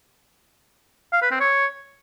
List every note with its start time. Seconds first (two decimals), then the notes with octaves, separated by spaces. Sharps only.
1.13 F5
1.22 B4
1.31 C4
1.40 C#5